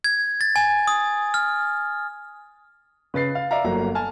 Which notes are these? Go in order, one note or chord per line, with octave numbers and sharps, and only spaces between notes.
G#6
A6
G#5
D#6
F6
C#3 B4 A6 C7
F5
D5 E5 F5 A#5
G1 F#3 A#3 A#5
G#5 A5 F6